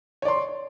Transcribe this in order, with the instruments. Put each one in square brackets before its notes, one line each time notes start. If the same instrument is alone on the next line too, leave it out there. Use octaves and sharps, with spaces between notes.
[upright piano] C#5
D5
C6